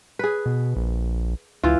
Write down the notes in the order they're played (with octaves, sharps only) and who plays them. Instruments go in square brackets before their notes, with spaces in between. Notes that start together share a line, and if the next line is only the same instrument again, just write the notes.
[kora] G#4 B4
[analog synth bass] B2
A#1
[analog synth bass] C#2 [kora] E3 F4